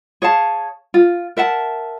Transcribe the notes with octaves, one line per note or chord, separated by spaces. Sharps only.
G#4 C#5 F5 A5
F4
A#4 E5 F#5 A5